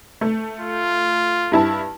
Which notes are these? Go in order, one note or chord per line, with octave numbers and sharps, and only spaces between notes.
A3
F4
G2 E4 A5